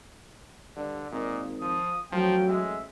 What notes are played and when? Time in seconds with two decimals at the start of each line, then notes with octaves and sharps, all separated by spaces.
0.76 G2 D3
1.12 G#1 A#2 D#5
1.61 F3 D#6
2.12 A1 F3 F#3 G5
2.48 G#3 E5